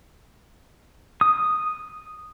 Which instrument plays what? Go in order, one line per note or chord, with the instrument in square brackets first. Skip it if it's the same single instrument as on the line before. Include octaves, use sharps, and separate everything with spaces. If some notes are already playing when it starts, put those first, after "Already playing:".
[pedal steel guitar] D#6